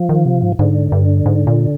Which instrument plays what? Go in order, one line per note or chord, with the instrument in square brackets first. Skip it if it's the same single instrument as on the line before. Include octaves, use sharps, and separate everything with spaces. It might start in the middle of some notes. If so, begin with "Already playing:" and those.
Already playing: [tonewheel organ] F3
[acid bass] D#3
C3
G#2
[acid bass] G#2 [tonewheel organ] D3
[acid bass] G2
G#2
A#2